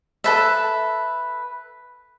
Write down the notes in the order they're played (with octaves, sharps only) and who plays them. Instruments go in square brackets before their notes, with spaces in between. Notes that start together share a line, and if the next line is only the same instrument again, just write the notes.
[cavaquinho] A4 B4 E5